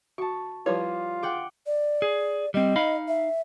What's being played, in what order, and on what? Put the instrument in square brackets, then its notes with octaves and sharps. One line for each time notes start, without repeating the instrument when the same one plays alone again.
[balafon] F#4 [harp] A5 C#6
[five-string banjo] F3 G3 C#5 [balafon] E4 G4 B4 [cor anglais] F4
[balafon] G#4 [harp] F#5 G5 D6
[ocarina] D5
[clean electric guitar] G#4
[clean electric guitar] G3 C4 [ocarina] D#5
[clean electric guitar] D#4 F5 B5
[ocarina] E5